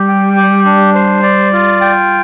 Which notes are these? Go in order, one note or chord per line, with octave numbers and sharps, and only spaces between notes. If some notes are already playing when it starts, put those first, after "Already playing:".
Already playing: G3 G4
G5
G4
D4
C5
D5
F4
G5